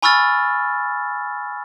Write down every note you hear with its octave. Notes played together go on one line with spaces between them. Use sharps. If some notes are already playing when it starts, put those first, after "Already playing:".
G#5 B5 C#6 E6 F6 A6